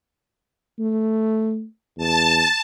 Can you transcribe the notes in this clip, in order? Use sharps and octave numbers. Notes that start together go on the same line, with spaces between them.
A3
E2 A5